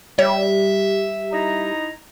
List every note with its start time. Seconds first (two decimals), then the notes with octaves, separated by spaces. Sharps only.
0.19 G3 C#5 E5
1.32 D#4 E4 A#5